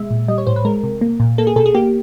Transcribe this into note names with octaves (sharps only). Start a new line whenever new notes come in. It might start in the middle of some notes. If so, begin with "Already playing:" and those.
Already playing: B2 G#3 E5
A#2
G3 D#5
C#5
A2 C5
B4
G#3 A#4
C3
A#3
A#2
A#3 A4
G#4
B2 A4
G#4
A#3 G4